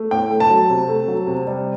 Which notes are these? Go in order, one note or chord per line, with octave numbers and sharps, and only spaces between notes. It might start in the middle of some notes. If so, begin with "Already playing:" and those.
Already playing: A3
A2 G5
A3
A5
F#3
C3
A3
F#3
C3
G3